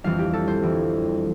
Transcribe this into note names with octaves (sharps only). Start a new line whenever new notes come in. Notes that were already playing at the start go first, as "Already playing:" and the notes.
F2 E3 G3 D4 F5
G4
A4
C5
F2 E3 G3 D4